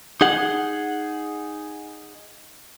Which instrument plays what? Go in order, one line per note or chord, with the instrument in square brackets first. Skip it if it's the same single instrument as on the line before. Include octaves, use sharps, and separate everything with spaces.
[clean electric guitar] D#4 G#4 F#5